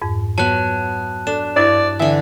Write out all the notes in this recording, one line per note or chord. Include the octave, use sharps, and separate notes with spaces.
F2 G#2
F#3 B3 A5 F#6
D4 A4 E7
G2 E4 D5
D3 E3 E5